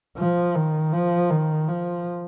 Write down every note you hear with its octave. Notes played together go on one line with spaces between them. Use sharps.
F3
D#3
F3
D#3
F3